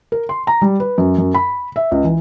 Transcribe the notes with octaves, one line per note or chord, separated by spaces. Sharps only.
A#4
C6
A#5
G3
B4
F#2
F#2
B5
E5
C#2
E3